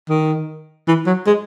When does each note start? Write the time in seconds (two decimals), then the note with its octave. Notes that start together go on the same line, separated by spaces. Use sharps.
0.09 D#3
0.88 E3
1.06 F#3
1.26 G#3